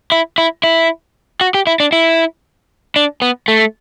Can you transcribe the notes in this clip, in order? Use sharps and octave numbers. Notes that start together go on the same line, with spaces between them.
E4
E4
E4
F#4
G4
E4
D4
E4
D4
B3
A3